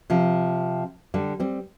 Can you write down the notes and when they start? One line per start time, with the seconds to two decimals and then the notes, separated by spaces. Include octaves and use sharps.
0.10 C3 F3
1.14 D3 G3
1.40 G3 C4